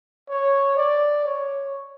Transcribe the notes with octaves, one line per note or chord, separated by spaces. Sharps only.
C#5
D5
C#5